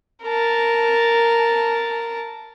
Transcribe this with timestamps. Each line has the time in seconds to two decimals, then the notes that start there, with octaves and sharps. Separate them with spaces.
0.24 A#4 A5